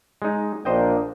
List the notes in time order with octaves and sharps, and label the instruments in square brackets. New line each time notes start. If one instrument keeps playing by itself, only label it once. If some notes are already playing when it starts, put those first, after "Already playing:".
[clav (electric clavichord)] G#3 D#4
[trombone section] A#1 A#3 D4 [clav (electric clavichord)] C5 D#5 G5